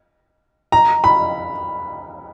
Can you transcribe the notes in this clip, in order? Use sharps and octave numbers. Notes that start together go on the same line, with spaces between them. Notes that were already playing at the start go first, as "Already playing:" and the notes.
A#5
B5